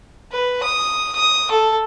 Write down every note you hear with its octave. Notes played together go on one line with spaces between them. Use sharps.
B4
D#6
D#6
A4